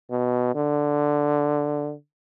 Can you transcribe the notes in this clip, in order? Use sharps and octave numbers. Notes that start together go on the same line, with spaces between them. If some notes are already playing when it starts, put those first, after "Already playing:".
B2
D3